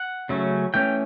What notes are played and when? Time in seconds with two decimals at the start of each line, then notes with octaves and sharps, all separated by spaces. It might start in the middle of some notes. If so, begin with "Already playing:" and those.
Already playing: F#5
0.29 C#3 F#3 A3 C#4
0.74 E3 A3 C#4 G5